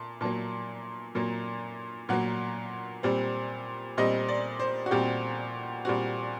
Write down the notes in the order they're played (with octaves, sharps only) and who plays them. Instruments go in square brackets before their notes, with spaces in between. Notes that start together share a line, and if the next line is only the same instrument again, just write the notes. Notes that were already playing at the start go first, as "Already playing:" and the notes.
Already playing: [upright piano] A#2 A5
A#2 F#3 A#3 A5
A#2 F#3 A#3
A#2 F#3 A#3 F#5
A#2 G3 C4
A#2 G3 C4 D#5
D5
C5
F#4
A#2 G3 C4 G4
A#2 G3 C4 F#4